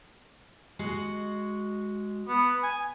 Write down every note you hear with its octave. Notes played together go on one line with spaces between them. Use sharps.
G#3 F#4 D#5
B3
G#5